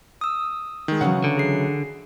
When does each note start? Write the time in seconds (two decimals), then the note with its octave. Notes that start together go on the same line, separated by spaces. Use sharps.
0.21 D#6 E6
0.88 D#3 G#3
1.01 C#3 E3 F#3 F#5
1.24 D3
1.37 G#4 C7